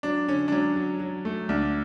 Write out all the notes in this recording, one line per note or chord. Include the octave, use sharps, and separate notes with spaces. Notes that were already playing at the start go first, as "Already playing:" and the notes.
F#3 D4
D3 C#4
D4
F#3 C#4
F#3
F#3
A3
D2 D4